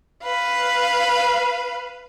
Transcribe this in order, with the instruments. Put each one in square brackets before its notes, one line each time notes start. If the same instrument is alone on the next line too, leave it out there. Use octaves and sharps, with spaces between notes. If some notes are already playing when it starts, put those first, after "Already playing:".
[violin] B4 F5